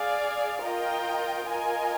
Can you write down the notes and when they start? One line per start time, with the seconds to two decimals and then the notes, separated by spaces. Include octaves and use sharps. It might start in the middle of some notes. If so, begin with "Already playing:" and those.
Already playing: G#4 D5 F5
0.63 F4 A#4 D#5 G5
1.48 F4 A#4 D#5 G#5